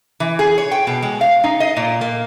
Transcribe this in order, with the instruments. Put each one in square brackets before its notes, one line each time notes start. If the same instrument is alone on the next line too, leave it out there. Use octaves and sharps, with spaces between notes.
[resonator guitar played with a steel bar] E3
G#4
C#5
G5
B2
G#3
F5
D#4
D#5
A#2
A#3